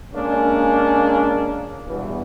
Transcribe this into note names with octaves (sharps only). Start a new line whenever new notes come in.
G#3 A#3 C#4 D4
E2 G2 B2 E3